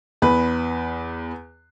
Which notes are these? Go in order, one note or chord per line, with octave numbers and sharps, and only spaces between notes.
E2 B4